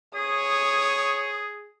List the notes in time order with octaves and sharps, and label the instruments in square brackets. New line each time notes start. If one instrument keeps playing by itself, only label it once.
[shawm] G#4 [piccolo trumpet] C#5 [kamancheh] D#6